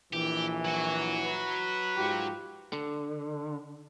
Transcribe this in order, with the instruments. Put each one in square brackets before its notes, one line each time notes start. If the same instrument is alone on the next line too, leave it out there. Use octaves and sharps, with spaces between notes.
[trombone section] A#1 E3 [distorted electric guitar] G4
[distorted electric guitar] F#3 F#4
[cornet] B4
[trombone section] G#2 F4 G4
[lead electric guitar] D3